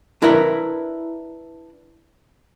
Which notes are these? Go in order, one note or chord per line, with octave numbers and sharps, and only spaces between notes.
D4 E4 A#4 B4 E5 A#5